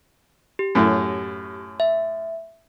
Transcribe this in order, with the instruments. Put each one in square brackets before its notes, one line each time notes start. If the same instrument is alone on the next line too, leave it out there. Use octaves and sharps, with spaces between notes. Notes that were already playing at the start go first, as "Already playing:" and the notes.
[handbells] G4
[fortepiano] F#2 A2
[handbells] E5